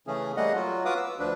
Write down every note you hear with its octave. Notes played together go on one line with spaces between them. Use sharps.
C#3 E3 A3 C#4 G#4
G3 A3 A#3 G#4 D#5 F#5
F#3 F4 F#4
F4 F#4 B4 F5 D6 D#6
E6
D2 F3 D4 B4